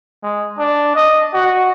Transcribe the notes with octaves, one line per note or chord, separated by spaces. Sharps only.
G#3
D4
D#5
F#4